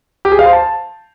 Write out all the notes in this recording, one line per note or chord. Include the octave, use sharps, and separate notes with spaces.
G4
G#4
F5
C5
A5